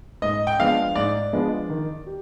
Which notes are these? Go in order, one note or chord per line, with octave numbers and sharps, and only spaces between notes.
G#2 D#5
G5
F3 G#3 B3 D4 F5
G#2 D5
F3 G#3 B3 D4
D#3
G4